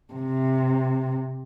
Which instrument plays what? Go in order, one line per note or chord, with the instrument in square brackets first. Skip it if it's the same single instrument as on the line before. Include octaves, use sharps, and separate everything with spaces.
[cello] C3